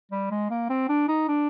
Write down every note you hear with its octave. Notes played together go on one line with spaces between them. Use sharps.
G3
G#3
A#3
C4
D4
D#4
D4